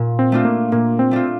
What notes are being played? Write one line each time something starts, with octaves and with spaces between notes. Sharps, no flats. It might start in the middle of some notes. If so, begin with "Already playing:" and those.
Already playing: A#2
C4
A3 D4 F4
A#3
A#2 A#3
C4
A3 D4 F4